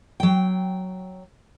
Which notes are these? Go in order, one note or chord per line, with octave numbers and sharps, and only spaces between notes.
F#3 G5